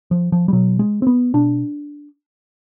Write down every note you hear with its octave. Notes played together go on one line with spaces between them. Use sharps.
F3
F3
G3
B2 F#3
G#3
C4
B3
B2 D4